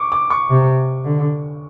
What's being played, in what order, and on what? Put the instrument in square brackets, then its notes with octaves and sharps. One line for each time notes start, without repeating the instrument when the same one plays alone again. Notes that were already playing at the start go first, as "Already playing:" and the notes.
Already playing: [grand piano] C#6 D6
D6
C#6
[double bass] C3
D3